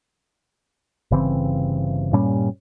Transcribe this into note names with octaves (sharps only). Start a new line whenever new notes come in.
G1 C#3 E3 C4
G2 A#2 G3 C#4